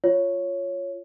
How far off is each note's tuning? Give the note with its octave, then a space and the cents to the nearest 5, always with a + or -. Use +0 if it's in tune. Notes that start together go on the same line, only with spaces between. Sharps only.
F4 +0 C#5 +0